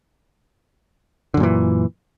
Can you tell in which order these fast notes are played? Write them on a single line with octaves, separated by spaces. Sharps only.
D3 F#2 A#2 E3